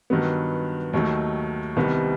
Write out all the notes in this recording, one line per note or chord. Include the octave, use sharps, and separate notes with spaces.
G2 D#3 F#3 B3
D#2 D#3 F#3 A3
C2 C3 D#3 G3 B3